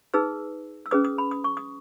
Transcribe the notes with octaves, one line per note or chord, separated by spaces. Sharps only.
D#4 G#4 B4 E6
E6
C#4 G#4 B4 D#6
D#6
B5
D#6
C#6
D#6